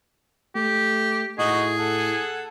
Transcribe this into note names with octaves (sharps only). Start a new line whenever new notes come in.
A3 G4
A2 D#4 F#4 G#4 D#5
A4 F#5